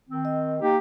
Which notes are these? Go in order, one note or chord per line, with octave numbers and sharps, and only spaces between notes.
D#3 C4
D#5
A#3 D#4 G4